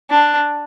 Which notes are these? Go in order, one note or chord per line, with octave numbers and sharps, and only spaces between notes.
D4